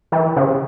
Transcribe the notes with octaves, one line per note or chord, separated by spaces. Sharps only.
E3
C#3